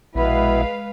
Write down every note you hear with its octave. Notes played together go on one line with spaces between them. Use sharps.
A#1 B2 G#3 B3 E4 B4 F5